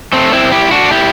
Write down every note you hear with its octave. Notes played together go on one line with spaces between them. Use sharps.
A3 C4
C4 E4
E4 G4
D4 F#4
E4 G4